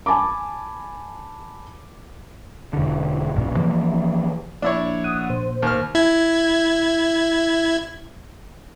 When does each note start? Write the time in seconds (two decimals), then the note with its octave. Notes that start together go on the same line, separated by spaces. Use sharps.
0.06 G#5 A5 B5 D6
2.73 E1 D3
3.36 B1 G2 A#2
3.57 E3 F3 A#3
4.62 A#1 D4 E4 C#5
5.04 F#5 D#6
5.30 A#2 C5
5.62 D#2 F6
5.95 E4 G#6